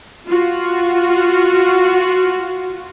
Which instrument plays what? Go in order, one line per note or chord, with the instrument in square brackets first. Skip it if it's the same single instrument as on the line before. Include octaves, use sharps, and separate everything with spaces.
[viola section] F4 F#4